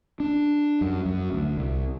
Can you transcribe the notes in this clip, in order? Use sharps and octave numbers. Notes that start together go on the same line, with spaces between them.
D4
F#2
F#2
D2
C2